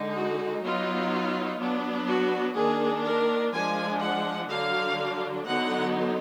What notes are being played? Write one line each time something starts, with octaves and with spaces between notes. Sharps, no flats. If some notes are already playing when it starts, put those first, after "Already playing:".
Already playing: D3 G#3 D#4
F#4
F#3 B3 D#4 F4
F#3 B3 D4
F#4
D#3 A#3 D4 G#4
A#4
F3 G#3 D4 G#5
F#5
D3 F#3 D4 F5
D3 F#3 B3 D#4 F#5